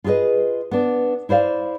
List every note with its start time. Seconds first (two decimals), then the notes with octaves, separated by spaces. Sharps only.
0.04 F4 G#4 A4 B4 D#5
0.71 B3 D4
1.29 E4 C5 D5 F5